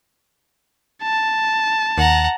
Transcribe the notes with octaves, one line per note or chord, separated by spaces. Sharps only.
A5
D#2 F#5 A#5